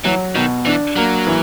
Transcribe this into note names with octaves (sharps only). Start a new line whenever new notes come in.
E3 F#3
B2 D#3
E3 D4
F#3 A#3
E3